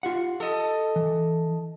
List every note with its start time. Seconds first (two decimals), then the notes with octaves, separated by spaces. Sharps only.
0.03 F4 G4 F#5
0.40 A4 D#5
0.96 E3